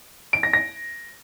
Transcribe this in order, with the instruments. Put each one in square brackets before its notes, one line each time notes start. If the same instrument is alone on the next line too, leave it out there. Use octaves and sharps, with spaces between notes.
[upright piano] D7
A#6
A#6